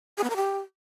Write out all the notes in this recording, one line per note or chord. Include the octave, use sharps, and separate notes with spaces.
G#4
B3
A#4
G4